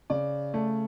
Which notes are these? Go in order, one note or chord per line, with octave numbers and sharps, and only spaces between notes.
C#3 D5
A3